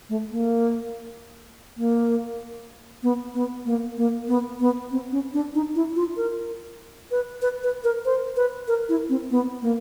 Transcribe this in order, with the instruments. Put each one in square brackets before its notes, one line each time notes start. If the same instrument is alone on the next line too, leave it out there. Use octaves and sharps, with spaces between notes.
[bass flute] A3
A#3
A#3
B3
B3
A#3
A#3
B3
B3
C4
C#4
D4
D#4
E4
F4
A#4
B4
B4
B4
A#4
C5
B4
A#4
E4
C4
B3
A#3